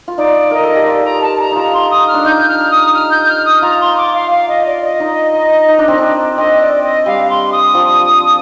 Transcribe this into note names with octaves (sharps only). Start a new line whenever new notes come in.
F4
D#4 D5
A#4 D#5
A4
G4
F4 D5
A#5
A5
A#5
D#4 F4 A#5
C6
D#6
F6
D4
D#4 G6
F6
D#6
F6
G6
F6
D#6
F4 A#5
C6
D6
F5
F5
D#5
D5
D#5
D#4
D#4
D4
C4
D4
C4 D#5
D5
D#5
G3 F5
C6
D#6
F3